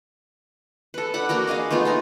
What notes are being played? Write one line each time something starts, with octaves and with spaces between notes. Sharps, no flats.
A4 B4
D4 B4 F#5 B5
A#3 D4 F#4 A#4
D4 G#4 D#5 F5
A3 B3 D#4 F4
A3 G#5 A#5